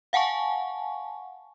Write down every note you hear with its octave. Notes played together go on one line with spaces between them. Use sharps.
F5 F#5 G#5 A5 C#6